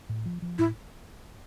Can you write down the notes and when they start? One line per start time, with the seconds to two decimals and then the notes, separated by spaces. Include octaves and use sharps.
0.09 A2
0.26 F3
0.42 F3
0.58 A2 E4